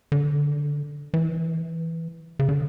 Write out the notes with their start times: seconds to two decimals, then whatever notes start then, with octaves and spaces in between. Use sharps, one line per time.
0.12 D3
1.14 E3
2.39 C#3
2.49 D3